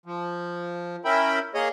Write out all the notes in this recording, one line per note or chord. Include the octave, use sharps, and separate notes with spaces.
F3
C#4 E4 A#4 E5 G5 B5
A#3 G#4 C#5 D#5